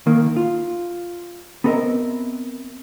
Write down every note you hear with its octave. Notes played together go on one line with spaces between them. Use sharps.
D#3 A#3
F4
B3 C4 A4 A#4 D#5 E5